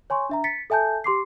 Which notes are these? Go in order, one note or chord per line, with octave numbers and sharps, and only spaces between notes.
C#5 G#5 C6 C#6
D4 E5 A#5
A6 B6 C#7
A4 E5 G#5 A5 G6
G4 C6 D6 C7